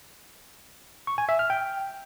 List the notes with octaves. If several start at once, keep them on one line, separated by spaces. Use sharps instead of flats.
C#6
G#5
E5
F6
G5